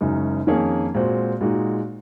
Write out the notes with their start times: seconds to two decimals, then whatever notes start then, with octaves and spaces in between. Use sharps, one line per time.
0.01 F#1 F#2 C#3 G#3 D#4
0.47 F2 D#3 A#3 C#4 G#4
0.94 A#2 G#3 C4 F#4 C5
1.41 A#2 G#3 D#4 F#4